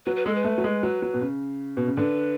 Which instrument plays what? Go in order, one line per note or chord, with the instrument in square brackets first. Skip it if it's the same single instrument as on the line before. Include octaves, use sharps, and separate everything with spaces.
[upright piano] F#3 [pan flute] B4
[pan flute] B4
[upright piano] G#3 [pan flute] A4
[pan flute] B4
[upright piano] A3
F#3
G#3
F#3
F#3
B2
C#3
B2
C#3
[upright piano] D3 [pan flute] B4